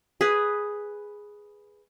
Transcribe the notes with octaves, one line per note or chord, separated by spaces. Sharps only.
G#4 B4